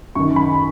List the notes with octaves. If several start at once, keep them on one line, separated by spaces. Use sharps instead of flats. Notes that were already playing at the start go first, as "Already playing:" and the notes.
F#2 D#3 C#6
B5